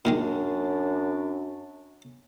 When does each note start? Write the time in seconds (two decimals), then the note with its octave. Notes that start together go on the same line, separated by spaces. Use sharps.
0.05 F#2 A#2 D#3 G#3 D4